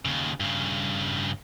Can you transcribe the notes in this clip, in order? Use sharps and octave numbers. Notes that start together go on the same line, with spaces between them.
D#2 C#3
G2 C#3